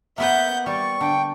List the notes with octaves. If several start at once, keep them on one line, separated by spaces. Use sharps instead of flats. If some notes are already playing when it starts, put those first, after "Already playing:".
A#3 B3 B4 E5 F#5 G6
G3 D5 C#6
D3 G5